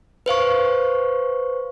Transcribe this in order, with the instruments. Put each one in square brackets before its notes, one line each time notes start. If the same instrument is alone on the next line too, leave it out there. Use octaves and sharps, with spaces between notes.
[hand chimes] B4 C5 F5 C#6